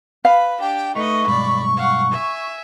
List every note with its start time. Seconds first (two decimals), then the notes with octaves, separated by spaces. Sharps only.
0.25 B4 F5 B5
0.61 D4 G4 G5
0.95 A3 D#4 B4 D#5 C#6
1.27 B1 G2 G#3 D5 B5
1.76 F5 F#5
2.11 E5 G#5